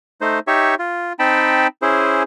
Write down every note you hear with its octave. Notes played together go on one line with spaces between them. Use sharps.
A3 D#4 C5
D#4 G4 C#5 E5 C#6
F4
C4 D#4 G5 A5 B5
C#4 E4 G#4 C5